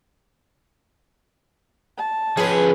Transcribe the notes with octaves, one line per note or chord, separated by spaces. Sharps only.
A5
F3 C#4 G#4 B4 C#5